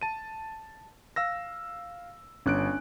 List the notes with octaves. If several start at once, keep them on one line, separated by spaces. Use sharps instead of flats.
A5 D#7
F5 E6 A#6
G1 C#4 D4 F#6 D7